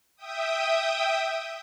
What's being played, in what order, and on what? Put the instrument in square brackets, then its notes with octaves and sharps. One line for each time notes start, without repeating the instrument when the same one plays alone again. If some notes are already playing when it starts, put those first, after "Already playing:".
[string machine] E5 G5 D#6